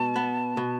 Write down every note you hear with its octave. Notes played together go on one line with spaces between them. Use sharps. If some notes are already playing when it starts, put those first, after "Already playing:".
Already playing: B2 G#3 A5
B3
B2